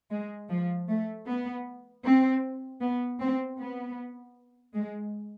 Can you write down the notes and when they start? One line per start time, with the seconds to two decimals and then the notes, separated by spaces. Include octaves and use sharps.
0.12 G#3
0.49 F3
0.89 A3
1.27 B3
2.04 C4
2.82 B3
3.19 C4
3.58 B3
4.74 G#3